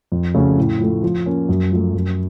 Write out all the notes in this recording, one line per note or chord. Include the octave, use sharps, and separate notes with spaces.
F2
C#3 A3 C#4 F#4
A2
F3 A3
F3
A#3 C#4
F#2
F3 A3
F#2